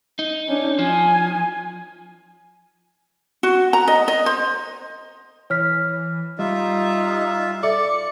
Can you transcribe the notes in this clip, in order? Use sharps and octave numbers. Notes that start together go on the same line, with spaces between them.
D#4
C#4 D4
F3 G#5
F#4
A#5
D#5
D#5
C5
E3 C#5 F6 B6
G3 D#4 F4 D#5 E5
A4 D5 E5 D6 C#7